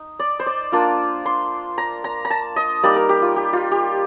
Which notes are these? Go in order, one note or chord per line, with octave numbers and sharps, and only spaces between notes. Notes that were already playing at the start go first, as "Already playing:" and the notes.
Already playing: D#4
D5
C5
D5
A#3 D4 F4
C6
A#5
A#5
A#5
A5
D#5
G3 A#3 D#4 D5
A#4
G4
F4
G4
F4
G4